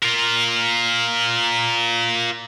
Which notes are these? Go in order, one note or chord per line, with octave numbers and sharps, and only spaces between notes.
F4 A#4